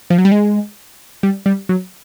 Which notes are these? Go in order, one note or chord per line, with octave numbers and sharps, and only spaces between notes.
F3
F#3
G3
G#3
G3
G3
F#3